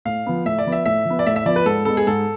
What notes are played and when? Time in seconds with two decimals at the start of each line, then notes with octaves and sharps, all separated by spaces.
0.05 A2 F5
0.26 F3 B3
0.45 A2 E5
0.59 D5
0.66 F3 B3
0.72 E5
0.86 A2 E5
1.05 F3 B3
1.19 D5
1.26 A2 E5
1.36 E5
1.45 F3 B3 D5
1.56 B4
1.66 G#2 A4
1.85 G#3 B3 A4
1.97 G#4
2.07 G#2 A4